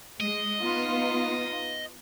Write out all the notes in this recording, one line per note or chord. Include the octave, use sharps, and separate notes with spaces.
G#3 D#5
B3 D#4 F4